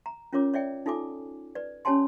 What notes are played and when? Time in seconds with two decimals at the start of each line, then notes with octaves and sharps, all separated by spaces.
0.06 A#5
0.33 C#4 F4 A#4 C#5 D6
0.54 C#5 D5 E5 G5
0.86 D#4 F4 A4 G#5 D6
1.55 B4 D5
1.85 C#4 G4 C#5 G#5 A5 C6